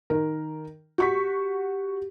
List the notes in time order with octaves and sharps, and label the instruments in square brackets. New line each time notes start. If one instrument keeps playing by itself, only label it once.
[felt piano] D#3 A#4
[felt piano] F#4 C#6 B6 [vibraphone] G4